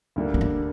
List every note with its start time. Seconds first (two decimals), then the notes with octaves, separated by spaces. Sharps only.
0.16 D2 D3 G3 A#3
0.34 C4
0.41 D4